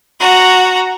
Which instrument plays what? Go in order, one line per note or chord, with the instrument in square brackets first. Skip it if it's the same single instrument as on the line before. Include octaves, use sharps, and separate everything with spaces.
[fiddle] F#4 A#5